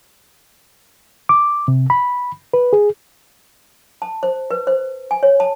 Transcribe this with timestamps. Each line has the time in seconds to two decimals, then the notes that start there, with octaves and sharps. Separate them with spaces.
1.29 D6
1.68 C3
1.90 B5
2.54 B4
2.73 G#4
4.02 A5
4.23 C5
4.51 B4
4.67 C5
5.11 G#5
5.23 C#5
5.40 A5